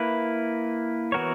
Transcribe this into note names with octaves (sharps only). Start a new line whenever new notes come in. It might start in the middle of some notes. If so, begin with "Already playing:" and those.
Already playing: A#3 E4 B4
E3 B3 F#4 A#4 C#5